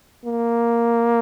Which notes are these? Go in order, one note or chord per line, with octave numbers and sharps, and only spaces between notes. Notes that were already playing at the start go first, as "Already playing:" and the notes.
A#3